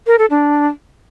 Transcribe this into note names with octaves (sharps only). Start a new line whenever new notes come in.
A#4
A4
D4